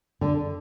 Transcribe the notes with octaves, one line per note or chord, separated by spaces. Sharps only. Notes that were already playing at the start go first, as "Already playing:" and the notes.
D3